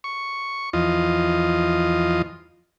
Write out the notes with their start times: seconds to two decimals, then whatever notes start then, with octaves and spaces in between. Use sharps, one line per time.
0.04 C#6
0.73 E2 F3 F4 D#5